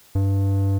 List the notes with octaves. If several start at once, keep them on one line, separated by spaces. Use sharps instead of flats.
G2